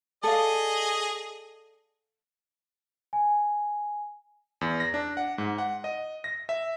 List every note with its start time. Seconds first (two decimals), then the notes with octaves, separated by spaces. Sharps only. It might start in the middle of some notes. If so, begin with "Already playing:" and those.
0.24 G#4 A4 D5 D#5 F5
3.13 G#5
4.61 E2
4.80 A#6
4.94 D4
5.17 F#5
5.38 G#2
5.58 F#5
5.84 D#5
6.24 A#6
6.49 E5